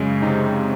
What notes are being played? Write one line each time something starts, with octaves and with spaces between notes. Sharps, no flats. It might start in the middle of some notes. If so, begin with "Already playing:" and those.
Already playing: F#2 C#3 G#3
C3 D#4